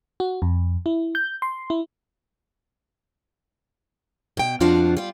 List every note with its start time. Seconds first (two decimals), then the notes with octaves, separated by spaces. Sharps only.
0.20 F#4
0.42 F2
0.86 E4
1.15 G6
1.42 C6
1.70 E4
4.37 B2 G5
4.60 F2 F3 D4 F4 F#4
4.97 G3 F4